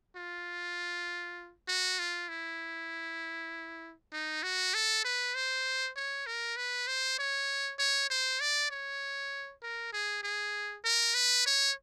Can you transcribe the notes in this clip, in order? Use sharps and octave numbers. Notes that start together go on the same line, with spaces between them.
F4
F#4
F4
E4
D#4
F#4
A4
B4
C5
C#5
A#4
B4
C5
C#5
C#5
C5
D5
C#5
A#4
G#4
G#4
A#4
B4
C#5